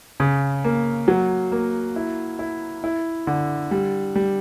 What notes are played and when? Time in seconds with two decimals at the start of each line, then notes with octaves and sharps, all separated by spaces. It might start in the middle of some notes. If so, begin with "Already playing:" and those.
0.20 C#3
0.64 A#3
1.08 F#3
1.52 A#3
1.96 E4
2.39 E4
2.84 E4
3.27 D3
3.71 G3
4.16 G3